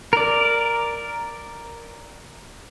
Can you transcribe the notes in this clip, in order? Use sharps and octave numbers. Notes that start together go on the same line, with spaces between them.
A#4 D5